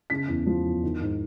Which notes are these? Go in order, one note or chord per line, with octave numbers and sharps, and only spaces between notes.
C#3 B6
E2
F3
E2
D#3
G#2